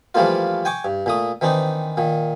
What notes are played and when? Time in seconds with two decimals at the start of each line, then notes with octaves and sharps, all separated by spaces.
0.15 E3 F3 G3 A3 A#3 F4
0.65 G5 G#5 C#6 D6
0.85 G2
1.06 A#2 A3 D#6
1.41 D#3 E3 C4 D4 D#4
1.97 A#2 D#3